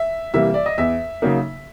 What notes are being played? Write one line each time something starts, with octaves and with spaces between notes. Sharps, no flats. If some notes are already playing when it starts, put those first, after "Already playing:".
Already playing: E5
C3 E3 G3 A#3 E5
D5
D#5
E2 E5
C#3 F#3 A#3 D#4